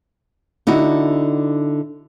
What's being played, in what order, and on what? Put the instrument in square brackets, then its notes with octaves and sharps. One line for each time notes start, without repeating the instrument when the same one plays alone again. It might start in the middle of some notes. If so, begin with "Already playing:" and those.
[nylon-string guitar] D3 D#4 E4 F#4